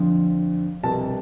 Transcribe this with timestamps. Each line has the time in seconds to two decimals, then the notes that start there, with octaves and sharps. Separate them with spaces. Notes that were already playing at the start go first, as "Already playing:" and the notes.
Already playing: F2 D3 F3
0.83 C2 B2 A5